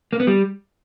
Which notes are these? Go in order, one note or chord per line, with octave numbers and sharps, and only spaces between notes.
A#3
B3
G3